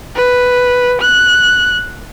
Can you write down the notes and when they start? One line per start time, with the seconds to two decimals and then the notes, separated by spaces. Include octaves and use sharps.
0.16 B4
1.01 F#6